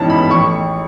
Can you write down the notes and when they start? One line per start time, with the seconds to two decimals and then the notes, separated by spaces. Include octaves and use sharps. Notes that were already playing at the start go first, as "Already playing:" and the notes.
Already playing: A1 G#2 E3 G#3 C#4 A5
0.10 B5
0.30 A1 C#6